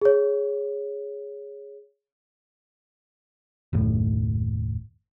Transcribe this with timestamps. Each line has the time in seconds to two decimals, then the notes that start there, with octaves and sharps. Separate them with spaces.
0.01 G#4 C#5
3.73 F#1 D#2 A2